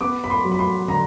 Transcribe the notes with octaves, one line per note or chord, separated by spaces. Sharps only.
B3 D6
B5
C6
F#3
B5
C6
D3 A#5